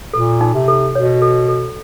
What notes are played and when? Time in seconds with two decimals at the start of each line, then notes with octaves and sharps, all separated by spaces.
0.13 A#2 A4
0.41 D#4
0.54 C3
0.68 A4
0.95 B2 C#5
1.22 A4
1.49 A4